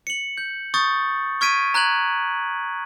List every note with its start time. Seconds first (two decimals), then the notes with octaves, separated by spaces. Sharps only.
0.07 C#7 F#7
0.37 G6
0.74 C#6 D#6 G6 A6
1.41 C#6 F6 G#6 B6 D7 D#7
1.74 A#5 F#6 G#6 F#7